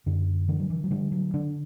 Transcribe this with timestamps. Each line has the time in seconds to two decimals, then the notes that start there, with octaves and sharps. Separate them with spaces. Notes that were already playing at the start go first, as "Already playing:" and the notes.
0.06 F#2 D3
0.49 D3 E3
0.60 F#3
0.70 E3
0.84 F#3
0.91 D3 G3
1.12 F#3
1.34 D3 D4